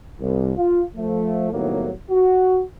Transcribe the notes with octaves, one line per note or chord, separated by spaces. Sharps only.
C2
F4
F3 A3
C2 A2 D#3 F#3 A#3 B3
F#4